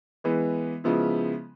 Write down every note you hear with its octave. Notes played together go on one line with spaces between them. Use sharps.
E3 G#3 B3
C#3 F3 G#3 B3 E4